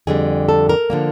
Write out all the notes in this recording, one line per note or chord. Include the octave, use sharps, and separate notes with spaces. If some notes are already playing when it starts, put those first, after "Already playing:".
F2 D3 G3 G#4
A4
A#4
D3 F3 A#3